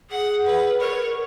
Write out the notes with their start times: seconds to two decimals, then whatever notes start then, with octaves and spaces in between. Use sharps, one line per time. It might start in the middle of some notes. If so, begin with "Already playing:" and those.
0.10 G#4 F#5
0.45 B4
0.80 A#4 C#5